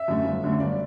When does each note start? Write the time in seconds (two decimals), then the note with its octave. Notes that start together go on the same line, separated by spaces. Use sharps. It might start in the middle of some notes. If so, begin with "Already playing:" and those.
Already playing: E5
0.08 F#2 D3 A3
0.25 G1
0.44 F#2 D3 A3
0.60 G1 D5